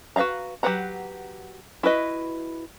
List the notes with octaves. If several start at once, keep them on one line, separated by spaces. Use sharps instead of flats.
F#4 B4 E5 F5 A#5
F#3 G4 B4 F#5 A#5
E4 F#4 B4 D#5